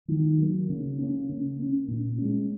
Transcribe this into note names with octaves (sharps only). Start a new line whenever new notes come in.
D#3
F#3 A#3
C#3
A#3 C#4
C#3
A#3 C#4
A#2
G#3 C#4